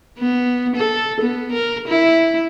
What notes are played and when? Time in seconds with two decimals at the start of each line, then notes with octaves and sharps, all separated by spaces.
0.19 B3
0.76 A4
1.21 B3
1.52 A#4
1.88 E4